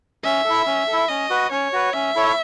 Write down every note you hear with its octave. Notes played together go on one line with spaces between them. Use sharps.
C#4 E5
E4 A4
C#4
A4
E4
C#4 D#5
F#4 B4
C#4 C#5
F#4 B4
C#4 E5
E4 A4 C#5